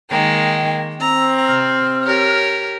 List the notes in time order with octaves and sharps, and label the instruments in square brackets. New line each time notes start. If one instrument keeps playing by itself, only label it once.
[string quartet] D#3 G#3 A#3 [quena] G5
[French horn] C4 [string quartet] A#5 [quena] E6
[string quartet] C3 [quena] F6
[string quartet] G4 A#4 C#5